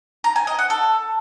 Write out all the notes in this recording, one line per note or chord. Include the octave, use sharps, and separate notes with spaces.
A#5
G#5
D#5
F#5
A4